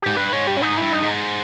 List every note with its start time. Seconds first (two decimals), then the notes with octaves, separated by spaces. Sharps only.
0.02 G#2 G4
0.17 G2 B4
0.33 G#2 C#5
0.47 G2 G4
0.57 C#4
0.62 G#2 D#4
0.78 G2 E4
0.92 D#4
1.02 G#2